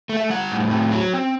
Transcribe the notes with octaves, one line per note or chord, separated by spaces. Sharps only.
A3
E5
G3 F#5
A2
C4
F#3
C4